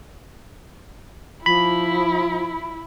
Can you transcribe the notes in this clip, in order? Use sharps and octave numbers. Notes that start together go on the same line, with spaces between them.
F3 E4 B5